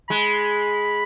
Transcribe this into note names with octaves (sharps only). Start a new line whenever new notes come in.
G#3 B5